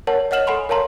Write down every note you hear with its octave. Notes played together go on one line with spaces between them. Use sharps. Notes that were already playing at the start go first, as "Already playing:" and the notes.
A#4 C#5 F#5 A5
C#5 D#5 F#5 F6 E7 F#7
A4 F#5 G#5 B5 C6
A#4 C#5 F5 A5 A#5 C6